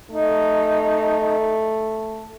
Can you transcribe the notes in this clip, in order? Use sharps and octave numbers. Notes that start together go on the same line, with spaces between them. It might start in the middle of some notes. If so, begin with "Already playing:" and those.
A3 D#4